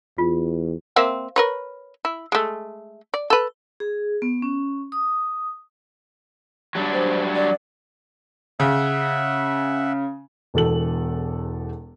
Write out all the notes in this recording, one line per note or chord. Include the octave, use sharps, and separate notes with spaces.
E2 F4
A#3 C4 E5
A#4 B4 C#5
E4
G#3 A3
D5
A4 B4
G#4
B3
C#4
D#6
F#3 G3 D4
C5
D5
C#3 E5 F#5
E1 E2 A4 F#7